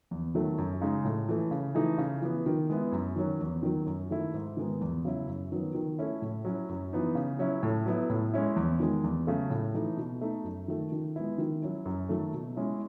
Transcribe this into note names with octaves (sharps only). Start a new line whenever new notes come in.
E2
D#3 F#3 A3
F#2
C#3 G#3 D#4
A2
E3 A3
C#3
E3 A3 D#4
C#3
E3 B3
D#3
G#3 B3 E4
F#2
D#3 F#3 C#4
E2
D#3 F#3
F#2
D#3 A3 E4
G#2
D#3 G#3 B3 D#4
E2
C#3 F#3 C#4 E4
F#2
D#3 F#3 B3
D#3
A3 C#4 E4
A2
F#3 C#4 E4
F#2
E3 B3 D#4
C#3
F#3 C#4 E4
A2
F#3 B3 E4
A2
G#3 C#4 E4
E2
D#3 G#3
E2
C#3 F#3 A3
A2
E3 A3 D#4
B2
A3 D#4
F#2
D#3 A3
D#3
G#3 B3 E4
D#3
F#3 C#4 E4
F#2
D#3 F#3 A3
B2
G#3 C#4 E4